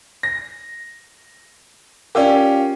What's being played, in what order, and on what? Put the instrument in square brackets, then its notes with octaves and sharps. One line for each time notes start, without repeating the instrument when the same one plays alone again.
[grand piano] A#6
[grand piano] C#4 F4 G4 [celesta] A#4 D5